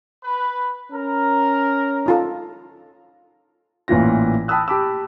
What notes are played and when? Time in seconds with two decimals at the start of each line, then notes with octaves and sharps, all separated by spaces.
0.23 B4
0.91 C#4 A#4
2.06 D#4 F4 A4
3.88 A1 A#2 E3 F4 A#6
4.48 G5 A5 B5 D#6 E6 F#6
4.68 G4 A5 B5 D6 E6